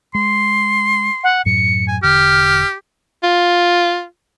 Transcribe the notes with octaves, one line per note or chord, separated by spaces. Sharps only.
G#3 C6
F#5
F#2 A2 F#3 C#7
G#5
E1 D3 G4 F6
F4